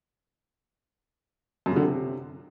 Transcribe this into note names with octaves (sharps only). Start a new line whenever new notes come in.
F#2
C#3
D3
C3